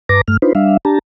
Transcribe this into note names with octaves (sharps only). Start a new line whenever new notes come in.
G2 B4 A5 A#5 D6 A#6
G2 A3 F6
D4 D#4 F4 B4 C5
G3 D4 E5 F5
D4 G4 A5 A#5